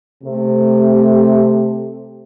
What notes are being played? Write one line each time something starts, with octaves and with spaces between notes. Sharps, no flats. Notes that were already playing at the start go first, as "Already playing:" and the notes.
C3 A3